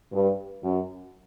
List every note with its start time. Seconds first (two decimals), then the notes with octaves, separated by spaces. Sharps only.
0.13 G2
0.63 F#2